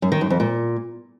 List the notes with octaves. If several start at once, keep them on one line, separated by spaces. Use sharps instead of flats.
F#2
D#3
F#2
F2
A#2